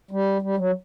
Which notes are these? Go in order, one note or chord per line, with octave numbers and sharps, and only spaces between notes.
G3
G3
F#3